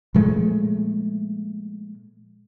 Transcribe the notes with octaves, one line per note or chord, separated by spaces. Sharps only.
A#2 F3 G#3 A3